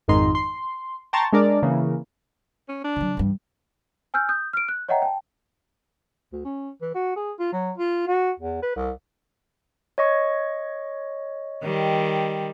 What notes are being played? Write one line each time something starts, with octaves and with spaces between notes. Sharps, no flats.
G#1 F2 G#2 D#3 D#4 C6
C6
G5 A5 A#5 C6 C#6 A6
G#3 D4 A#4 D5
C#3 E3 A#3
C#4
D4
D3 F#3
G2 E3
G#5 E6 F6 G6
D#6 G6
F6 D7
F#6
C#5 D#5 E5 F#5 G5 A#5
G5 A5
D2
C#4
E3
F#4
G#4
F4
F#3
F4
F#4
E2
B4
C2
C#5 D#5 C#6
D#3 G3